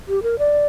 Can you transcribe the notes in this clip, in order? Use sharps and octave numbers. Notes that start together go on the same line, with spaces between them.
G4
A#4
D5